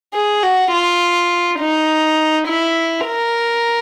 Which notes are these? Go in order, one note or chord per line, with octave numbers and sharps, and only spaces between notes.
G#4
F#4
F4
D#4
E4
A#4